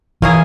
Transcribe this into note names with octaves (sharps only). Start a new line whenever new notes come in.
E3 A#3 C#4 E4 G#4